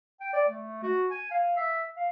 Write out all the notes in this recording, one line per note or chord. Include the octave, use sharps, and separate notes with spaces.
G5
D5
A3
F#4
G#5
F5
E5
F5